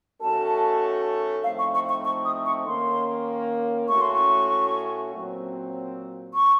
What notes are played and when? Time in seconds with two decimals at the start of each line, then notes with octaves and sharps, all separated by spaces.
0.21 D#3 A3 C#4 F#4 A4 A5
1.43 A2 F3 A3 C4 D#4 F5
1.59 C#6
1.74 C#6
1.89 C#6
2.05 C#6
2.25 D#6
2.46 C#6
2.66 D#3 A#3 C#4 C6
3.88 A2 A3 C#4 F#4 C#6
4.01 C6
4.13 C#6
5.12 A#2 F#3 C4
6.34 C#6